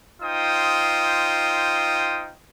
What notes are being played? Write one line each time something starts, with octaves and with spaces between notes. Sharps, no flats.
D#4 F4 C5 G5 D#6